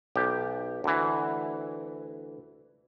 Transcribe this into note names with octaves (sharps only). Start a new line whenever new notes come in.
B1 G4
D2 E3